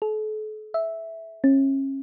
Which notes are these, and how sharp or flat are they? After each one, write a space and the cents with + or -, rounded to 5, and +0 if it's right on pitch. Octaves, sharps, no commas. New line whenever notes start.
A4 -40
E5 -5
C#4 -35